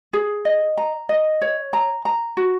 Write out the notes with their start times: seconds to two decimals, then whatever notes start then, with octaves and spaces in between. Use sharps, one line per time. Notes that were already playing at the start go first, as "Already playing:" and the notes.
0.13 G#4
0.45 D#5
0.77 A#5
1.09 D#5
1.41 C#5
1.73 A#5
2.05 A#5
2.37 F#4